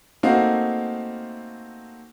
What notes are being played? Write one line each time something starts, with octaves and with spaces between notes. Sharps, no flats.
A3 A#3 C4 D#4 F#4 F5